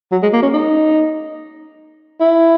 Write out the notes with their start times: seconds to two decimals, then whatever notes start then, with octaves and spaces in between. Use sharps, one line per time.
0.12 F#3
0.23 G#3
0.33 A#3
0.43 C#4
0.54 D#4
2.20 E4